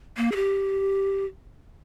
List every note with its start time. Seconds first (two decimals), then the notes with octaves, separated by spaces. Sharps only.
0.17 A#3
0.32 G#4
0.36 G4